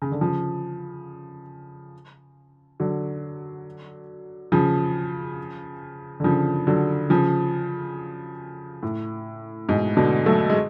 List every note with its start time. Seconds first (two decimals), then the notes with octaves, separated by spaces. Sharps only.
0.02 C#3
0.12 D3
0.21 C#3 F3
2.80 D3 F#3
4.52 C#3 F3
6.20 D3
6.24 C#3 F3
6.67 D3 F#3
7.10 C#3 F3
8.83 A2
9.69 G#2 B2
9.97 B2 D3
10.26 F#3 A3
10.49 G#3